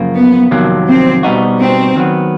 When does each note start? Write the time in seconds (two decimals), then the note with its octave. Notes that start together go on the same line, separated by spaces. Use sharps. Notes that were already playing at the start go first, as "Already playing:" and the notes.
Already playing: F#2 C#3 F3 A#3
0.15 B3
0.51 F2 C3 D#3 F#3 A#3
0.88 C4
1.23 B2 G3 B3 D#4 F#4
1.60 C4
1.96 D#3 F#3 B3